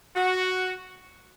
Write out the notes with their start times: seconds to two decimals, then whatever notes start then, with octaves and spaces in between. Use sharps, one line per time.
0.16 F#4